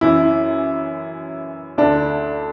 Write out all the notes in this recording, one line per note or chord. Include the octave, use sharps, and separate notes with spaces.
F#2 E3 E4
D2 D3 D4